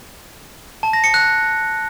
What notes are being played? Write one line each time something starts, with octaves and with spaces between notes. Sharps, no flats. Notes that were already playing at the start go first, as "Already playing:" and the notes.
A5
A#6
C#7
F#6